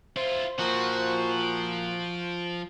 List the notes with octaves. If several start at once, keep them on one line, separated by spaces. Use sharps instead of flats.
E4 F4 C5
A#2 F3 F#4
D7